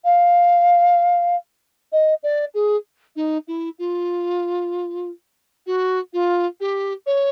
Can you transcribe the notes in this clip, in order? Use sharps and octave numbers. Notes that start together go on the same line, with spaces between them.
F5
D#5
D5
G#4
D#4
E4
F4
F#4
F4
G4
C#5